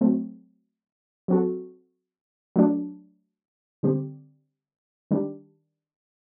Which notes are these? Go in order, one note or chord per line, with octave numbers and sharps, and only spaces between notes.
F#3 A3 C4
F#3 C4 F#4 A4
F#3 A3 D4
D3 G3 C4 G4
D#3 G3 D4